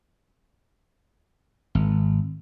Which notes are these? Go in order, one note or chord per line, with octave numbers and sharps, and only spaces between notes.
G#1